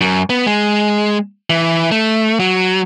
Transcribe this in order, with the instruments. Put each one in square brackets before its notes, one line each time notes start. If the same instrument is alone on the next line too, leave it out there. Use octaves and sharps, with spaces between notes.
[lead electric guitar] F#2
B3
G#3
E3
A3
F#3